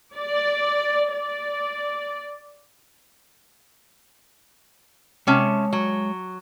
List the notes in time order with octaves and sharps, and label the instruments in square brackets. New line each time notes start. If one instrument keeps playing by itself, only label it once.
[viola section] D5
D5
[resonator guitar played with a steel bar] C3 C#4 A5 [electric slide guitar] G#3 C#5
[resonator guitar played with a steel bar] F#3